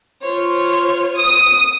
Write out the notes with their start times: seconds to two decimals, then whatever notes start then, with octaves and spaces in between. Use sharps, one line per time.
0.22 F4 C5 C#5
1.19 D#6